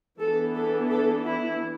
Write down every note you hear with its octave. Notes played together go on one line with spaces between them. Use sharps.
E3 B3 D4 A4
A4
A4
E4